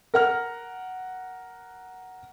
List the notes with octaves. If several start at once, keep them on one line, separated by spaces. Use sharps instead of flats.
A#4 F#5 F6